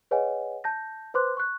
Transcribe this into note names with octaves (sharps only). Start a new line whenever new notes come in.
G#4 B4 C#5 D#5 F#5 G#5
A5 G6 A#6
B4 C5 C6 D6 F#6
C#6 F#6